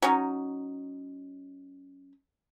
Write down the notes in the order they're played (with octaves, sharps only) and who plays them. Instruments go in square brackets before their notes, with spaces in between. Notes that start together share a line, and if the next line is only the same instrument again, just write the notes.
[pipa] F#3 C#4 D#4